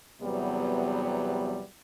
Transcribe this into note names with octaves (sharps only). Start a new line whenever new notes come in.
E2 C3 F#3 G3 B3